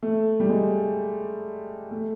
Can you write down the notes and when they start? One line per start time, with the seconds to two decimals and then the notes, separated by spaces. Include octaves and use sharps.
0.03 A3
0.40 G3
0.49 G#3
1.91 A3